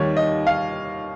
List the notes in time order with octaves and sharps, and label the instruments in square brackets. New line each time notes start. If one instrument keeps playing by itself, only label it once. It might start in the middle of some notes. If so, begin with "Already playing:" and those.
Already playing: [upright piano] D#2 D#3 G3 C#5
D#5
F5